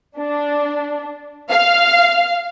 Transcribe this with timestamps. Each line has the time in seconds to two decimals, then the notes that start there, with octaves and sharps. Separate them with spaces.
0.19 D4
1.51 F5